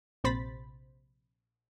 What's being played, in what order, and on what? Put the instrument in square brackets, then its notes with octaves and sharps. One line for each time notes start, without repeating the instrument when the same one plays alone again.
[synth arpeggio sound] A#1 C3 C5 B5 A6 B6